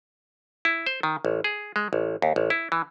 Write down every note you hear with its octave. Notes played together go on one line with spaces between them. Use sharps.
E4
C5
D#3
A1
G#4
G#3
A1
D#2
A1
E4
E3